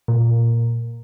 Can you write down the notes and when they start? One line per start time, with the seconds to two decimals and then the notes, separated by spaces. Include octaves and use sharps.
0.08 A#2